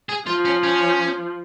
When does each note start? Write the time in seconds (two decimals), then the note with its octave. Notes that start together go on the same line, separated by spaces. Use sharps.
0.09 G#4
0.27 F3 F4
0.45 C#4
0.64 C#4